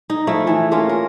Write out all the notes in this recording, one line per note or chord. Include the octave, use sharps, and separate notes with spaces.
D#4
F3 A3 E4
E3 E4
A3 A#3 C#4 F4
A#4